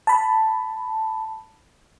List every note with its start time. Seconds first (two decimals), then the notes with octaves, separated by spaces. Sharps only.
0.07 A5 B5